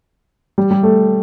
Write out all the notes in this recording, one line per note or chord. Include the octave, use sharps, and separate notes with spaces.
G3
G3
A3